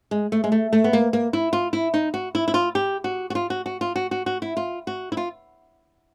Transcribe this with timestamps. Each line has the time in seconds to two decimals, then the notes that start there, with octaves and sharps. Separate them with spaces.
0.11 G#3
0.32 A3
0.44 G#3
0.52 A3
0.73 A3
0.84 B3
0.93 A#3
1.13 A#3
1.33 E4
1.53 F4
1.73 E4
1.94 D#4
2.14 F#4
2.35 E4
2.48 E4
2.54 F4
2.75 G4
3.04 F#4
3.30 F#4
3.35 F4
3.50 F#4
3.66 F#4
3.81 F4
3.96 F#4
4.11 F#4
4.26 F#4
4.42 E4
4.57 F4
4.87 F#4
5.12 E4
5.17 F4